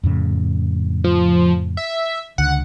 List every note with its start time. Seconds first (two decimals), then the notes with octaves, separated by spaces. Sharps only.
0.03 F2 A2 C#3
1.04 F3
1.77 E5
2.38 C#2 D3 F#5